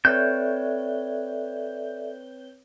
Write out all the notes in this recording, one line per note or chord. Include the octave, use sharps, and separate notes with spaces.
C4 A4 B4 C#5 D5 E5 G6